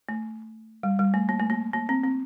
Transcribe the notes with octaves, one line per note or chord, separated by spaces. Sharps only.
A3
G3
G3
A3
A#3
A3
A#3
A#3
C4
C4